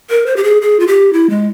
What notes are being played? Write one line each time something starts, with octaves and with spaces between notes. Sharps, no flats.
A#4
C5
G4
G#4
G#4
F4
G4
E4
G#3